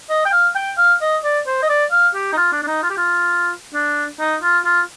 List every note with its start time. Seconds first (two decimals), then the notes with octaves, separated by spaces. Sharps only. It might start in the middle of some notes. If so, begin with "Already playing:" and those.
0.10 D#5
0.25 G5
0.32 F5
0.56 G5
0.78 F5
1.01 D#5
1.24 D5
1.47 C5
1.63 D#5
1.69 D5
1.92 F5
2.15 G4
2.33 D#4
2.37 F4
2.52 D4
2.63 D4
2.67 D#4
2.83 F4
2.90 G4
2.97 F4
3.74 D4
4.20 D#4
4.42 F4
4.65 F4